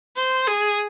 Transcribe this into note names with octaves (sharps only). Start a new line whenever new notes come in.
C5
G#4